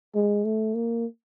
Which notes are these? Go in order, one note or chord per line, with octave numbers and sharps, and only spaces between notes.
G#3
A3
A#3